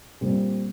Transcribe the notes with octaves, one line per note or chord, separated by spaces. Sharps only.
A#2 G3 C4